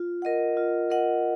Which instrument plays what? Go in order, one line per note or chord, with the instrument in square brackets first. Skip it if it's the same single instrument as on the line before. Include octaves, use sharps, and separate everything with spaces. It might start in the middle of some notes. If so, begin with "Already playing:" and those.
Already playing: [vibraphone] F4
A#4 D#5 F#5
F4
A#4 D#5 F#5